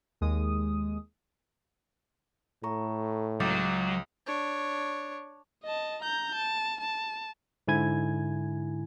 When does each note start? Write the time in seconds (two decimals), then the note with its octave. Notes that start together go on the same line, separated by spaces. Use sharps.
0.21 D#2 G#3 D#6
2.63 A2 A4 A#5 C#6
3.40 C#2 F#3 D6 G6 A6
4.27 D4 C#5
5.64 D#5 A5
6.02 A#5 G6
6.35 A5
6.81 A5
7.68 G#2 D3 E4 G#5 G#6